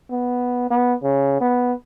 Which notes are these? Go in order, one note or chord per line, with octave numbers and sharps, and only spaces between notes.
B3
B3
C#3
B3